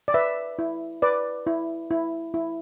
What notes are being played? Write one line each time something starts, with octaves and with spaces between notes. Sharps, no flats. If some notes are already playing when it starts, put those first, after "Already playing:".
D5
B4 E5
E4
B4 D5
E4
E4
E4